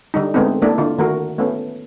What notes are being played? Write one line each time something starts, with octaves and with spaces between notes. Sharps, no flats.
D3 G3 D#4
D3 G#3 A3 B3 C4 D#4
A3 A#3 D4 E4
D3 F4
D#3 A3 F#4 A#4
A3 B3 C#4